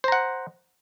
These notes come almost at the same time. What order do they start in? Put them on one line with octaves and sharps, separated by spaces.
C5 A#5 F#5